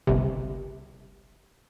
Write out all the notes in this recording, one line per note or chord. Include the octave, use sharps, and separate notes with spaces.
G1 C2 C3